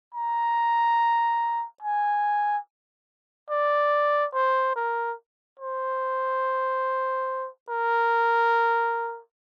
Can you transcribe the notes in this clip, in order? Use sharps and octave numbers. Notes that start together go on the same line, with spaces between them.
A#5
G#5
D5
C5
A#4
C5
A#4